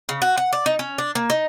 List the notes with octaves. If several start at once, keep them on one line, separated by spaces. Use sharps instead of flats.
C#3
F#4
F#5
D5
D#4
C#4
D4
A#3
D#4